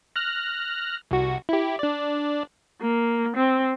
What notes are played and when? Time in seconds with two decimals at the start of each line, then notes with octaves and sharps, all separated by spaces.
0.16 F6 F#6 A#6
1.11 C2 F#4
1.49 E4 G4
1.79 D4 D5
2.81 A#3
3.36 C4